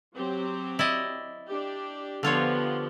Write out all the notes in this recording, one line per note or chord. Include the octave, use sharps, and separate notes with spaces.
F#3 C4 G4
E4 D5 D#5
D4 G4
D3 F3 B3 F4 G4 C#5